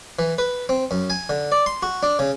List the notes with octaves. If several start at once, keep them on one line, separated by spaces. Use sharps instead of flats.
E3
B4
C4
F#2
G#5
D3
D5
C6
F#4
D4
C#3